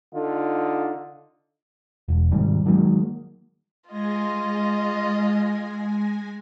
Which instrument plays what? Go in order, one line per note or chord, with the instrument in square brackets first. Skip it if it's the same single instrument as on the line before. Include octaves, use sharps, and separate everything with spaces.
[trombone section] D3 D#4 F4
[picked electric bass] E1
G#2 C3 D#3 G3
D#3 F#3 G#3 A#3
[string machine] G#3 G#5 A#6 [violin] F4 D#5